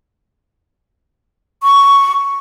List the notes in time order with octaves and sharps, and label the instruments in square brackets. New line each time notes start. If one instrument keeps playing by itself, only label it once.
[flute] C#6